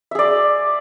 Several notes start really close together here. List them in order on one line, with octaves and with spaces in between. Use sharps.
E5 G#4 D5